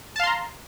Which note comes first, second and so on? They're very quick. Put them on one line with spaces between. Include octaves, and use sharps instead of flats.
A5 F5 C6 A#5